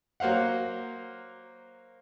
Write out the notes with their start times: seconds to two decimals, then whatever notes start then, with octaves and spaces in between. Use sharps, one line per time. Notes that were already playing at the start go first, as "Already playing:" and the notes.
0.20 F#3 A#3 C5 F5 F#5